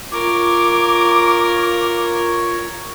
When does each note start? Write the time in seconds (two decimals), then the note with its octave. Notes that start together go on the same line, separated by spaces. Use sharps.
0.12 F4 A#4 C#5 D6